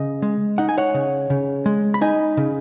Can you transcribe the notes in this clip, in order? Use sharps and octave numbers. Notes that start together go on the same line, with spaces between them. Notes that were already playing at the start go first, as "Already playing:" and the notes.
Already playing: C#3 D#5
G#3
D#4 F#5
G#5
C#5 F#5
C#3
C#3
G#3
B5
D#4 D#5 G#5
C#3